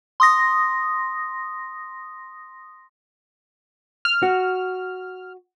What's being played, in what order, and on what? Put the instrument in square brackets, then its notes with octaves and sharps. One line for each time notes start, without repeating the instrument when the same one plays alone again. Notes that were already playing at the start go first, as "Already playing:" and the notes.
[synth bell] C6 D#6 A#6
[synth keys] F6
[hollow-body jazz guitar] F#4